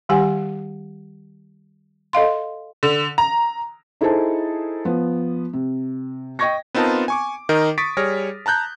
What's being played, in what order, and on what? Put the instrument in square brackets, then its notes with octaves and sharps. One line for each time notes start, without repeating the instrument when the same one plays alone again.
[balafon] D#3 G3 G4 F#5 G#5
A4 D#5 F5 C6
[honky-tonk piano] D3
A#5
[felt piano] D#4 E4 G#4 A4 C5 A5
F3 B3
C3
D#5 G5 C#6 G#6 A#6
[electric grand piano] B3 C4 D#4 F4 A#4 A5
G#5 C#6 D6
D#3 D#4 A#4 D#5
C#6 D#6 A6 B6 D7
G3 G#4 C#5 F6 A#6
A5 A#5 F#6 G6